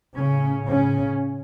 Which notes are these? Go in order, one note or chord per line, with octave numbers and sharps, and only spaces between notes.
A2 C#3 C#4
C#3 C#4